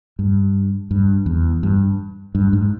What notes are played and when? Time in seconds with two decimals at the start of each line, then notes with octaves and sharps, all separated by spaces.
0.19 G2
0.91 G2
1.26 E2
1.63 G2
2.35 G2
2.53 G#2